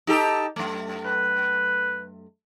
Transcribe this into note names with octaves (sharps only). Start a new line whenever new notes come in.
D#4 G4 A4
F#2 A3
B4